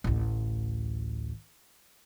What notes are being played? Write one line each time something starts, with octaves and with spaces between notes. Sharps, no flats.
A1 D2